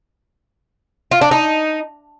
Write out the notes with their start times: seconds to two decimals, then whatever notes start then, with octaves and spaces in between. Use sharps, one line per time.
1.11 F4
1.21 D4
1.31 D#4